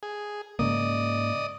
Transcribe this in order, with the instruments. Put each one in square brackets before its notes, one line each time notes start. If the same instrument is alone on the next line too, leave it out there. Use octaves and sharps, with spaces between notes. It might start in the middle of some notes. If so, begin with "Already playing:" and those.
[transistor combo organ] G#4
[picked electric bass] G#2 C#3 A#3 [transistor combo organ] D5 D#5 D#6